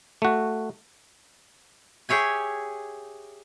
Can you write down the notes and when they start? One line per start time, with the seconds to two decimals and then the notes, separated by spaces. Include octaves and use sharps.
0.22 A3 F#4
2.09 G4 G#4 C#5 E5 G#5